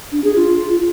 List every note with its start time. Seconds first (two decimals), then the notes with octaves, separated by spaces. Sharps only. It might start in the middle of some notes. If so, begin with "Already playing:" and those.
0.12 D4
0.24 G#4
0.36 F4